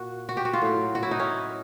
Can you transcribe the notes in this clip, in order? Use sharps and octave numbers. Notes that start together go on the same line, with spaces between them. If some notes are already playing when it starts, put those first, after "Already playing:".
Already playing: A#2 F#4
F#4
G4
F#4
F4
A2 F#3
F#4
E4
D#4
C#4